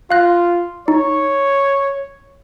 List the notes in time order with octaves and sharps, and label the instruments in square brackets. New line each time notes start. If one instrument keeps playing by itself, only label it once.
[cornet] F4 [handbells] F5 F#6 A#6
[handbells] D#4 [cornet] C#5